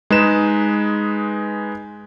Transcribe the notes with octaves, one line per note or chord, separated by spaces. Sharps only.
G#3 D#4 G#4 B4 E7